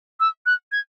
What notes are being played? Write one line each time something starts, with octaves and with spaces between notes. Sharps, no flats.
E6
F#6
G#6